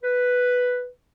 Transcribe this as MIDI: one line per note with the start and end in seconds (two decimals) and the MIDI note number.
0.04 0.87 71